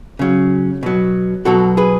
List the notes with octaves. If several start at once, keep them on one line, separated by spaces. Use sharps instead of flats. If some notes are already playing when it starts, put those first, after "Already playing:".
C#3 F#3
B2 F#3
B2 F#3 F#4 A4
G#4 B4